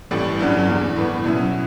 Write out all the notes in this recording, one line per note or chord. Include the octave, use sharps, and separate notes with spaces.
A1 A2 E3 G3
G1 G2 F#3 C#4
E2 C#3 E3
A2 E3 B3
B2 F#3 C#4 E4